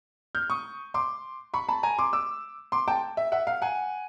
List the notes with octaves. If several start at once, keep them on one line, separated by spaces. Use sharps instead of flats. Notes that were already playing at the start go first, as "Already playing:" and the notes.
F6 G6
C#6 D#6
C6 D6
B5 C#6
A5 B5
G#5 A#5
C6 D6
D6 E6
C6 D6
G5 A5
E5
E5 F#5
F5
F#5 G#5